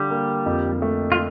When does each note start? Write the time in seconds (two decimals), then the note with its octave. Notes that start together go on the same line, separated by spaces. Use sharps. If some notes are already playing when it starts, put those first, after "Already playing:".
Already playing: D3 G3 F4 G4
0.10 A#3
0.46 F2
0.82 A3
1.12 F4